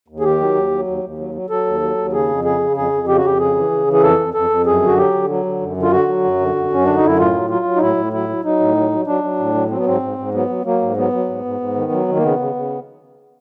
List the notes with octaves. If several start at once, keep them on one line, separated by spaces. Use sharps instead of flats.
D#2
G#4
D#3 G4
F#3
D#2
F#3
D#2
D#2
F#3
F#3
F#3 A4
D#2
F#3
D#2
C#3 G#4
F2
C#3 G#4
C#3
F2 G#4
F2
C#3 G4
F#4
F2 G4
C#3 G#4
E3
C#3
E3
G#4
F2 A4
F2
F2 A4
F2
F#2 G#4
D3 F#4
F#3 G4
D3
F#3
D3
F#2
D3
F4
D3 F#4
F#3
F#2
D3
F#2
F#2 C#4
D3 D4
D#4
F#2 E4
A2 F4
F#3
F#3 F4
F#3
D#4
A2 E4
A2
F#3 E4
F#3
F#3 D#4
A2
F#3
F#3
F#3 D4
F#3
A2
F#3
F#3 C4
B3
G#2 C4
G#2
G#2
F#3 B3
F#3
F#3 A#3
G#2
F#3 B3
F#3
G#2
G#2
G#2
D#3
F#3
D#3
A#3
C#3 B3
C#3
C#3